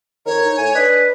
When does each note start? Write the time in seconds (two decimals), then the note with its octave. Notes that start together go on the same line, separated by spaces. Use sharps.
0.26 F2 D#3 A#4 C#5
0.45 D#4
0.57 A2 G#5
0.75 D4 B4 D#5